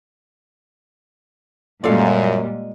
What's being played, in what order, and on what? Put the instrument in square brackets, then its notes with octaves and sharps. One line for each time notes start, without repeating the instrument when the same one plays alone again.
[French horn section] F#2 [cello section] A#2 G3 [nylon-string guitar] G#3 D5 [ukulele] F4 A4 F5